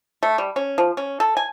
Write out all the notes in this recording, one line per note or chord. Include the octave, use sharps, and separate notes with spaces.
A3
G3
C#4
F3
C#4
A4
G#5